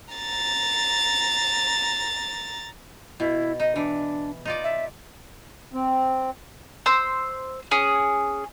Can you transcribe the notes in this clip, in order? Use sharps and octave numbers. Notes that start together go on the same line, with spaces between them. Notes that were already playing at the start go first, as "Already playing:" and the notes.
A#5 A6
B2 E4
D#4 D#5
E3 D4
D#4 F4 D5
E5
C4
C5 E6
C#4 G#4